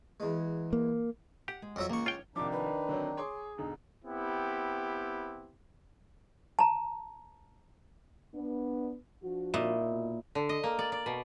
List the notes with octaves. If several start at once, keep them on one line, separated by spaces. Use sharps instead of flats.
E2 G#3
A#3
G4 F#5
G#3
F2 F#3 E5
C#2 A#3 C#6
F4 C#5 G5
C2 D#3 F3 D4 D#4 D6
B4
D3 F#3 C4
G#4 C#5 C6 D6
E1 D3 D#4
B3 C4 E4 G4
A5 A#5
B3 D4
F3 D4 F#4
A#2 D#4 E4
B2
D3
D#5
A#3
D5
D5
B2